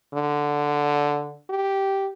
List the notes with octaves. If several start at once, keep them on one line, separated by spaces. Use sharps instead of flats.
D3
G4